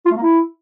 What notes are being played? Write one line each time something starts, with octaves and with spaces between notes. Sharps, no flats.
F4
A3
A#3
E4